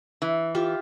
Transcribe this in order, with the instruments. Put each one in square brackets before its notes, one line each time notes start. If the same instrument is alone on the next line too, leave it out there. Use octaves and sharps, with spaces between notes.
[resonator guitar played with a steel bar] E3
[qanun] F4 G4 E5